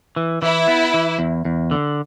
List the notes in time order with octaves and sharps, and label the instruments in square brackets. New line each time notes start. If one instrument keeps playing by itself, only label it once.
[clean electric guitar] E3
[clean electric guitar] E3 [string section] E4
[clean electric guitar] B3
E3
E2
E2
D3